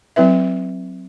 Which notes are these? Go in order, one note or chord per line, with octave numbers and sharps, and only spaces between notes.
F#3 C4 E4 B4 E5